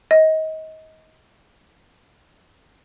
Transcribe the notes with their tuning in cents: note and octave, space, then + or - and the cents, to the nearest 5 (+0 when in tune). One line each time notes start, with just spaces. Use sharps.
D#5 +25